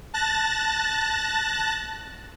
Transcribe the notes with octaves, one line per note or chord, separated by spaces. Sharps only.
A5 F#6 A6 A#6